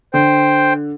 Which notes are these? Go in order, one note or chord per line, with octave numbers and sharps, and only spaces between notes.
D3 C5 G5